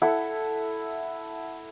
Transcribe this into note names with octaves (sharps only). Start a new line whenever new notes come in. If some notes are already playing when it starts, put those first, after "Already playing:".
E4 A4 F#5